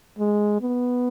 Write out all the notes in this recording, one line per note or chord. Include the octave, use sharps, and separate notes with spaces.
G#3
B3